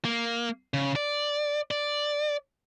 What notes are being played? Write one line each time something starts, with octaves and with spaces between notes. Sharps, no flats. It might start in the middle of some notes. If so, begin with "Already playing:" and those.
A#3
C#3
D5
D5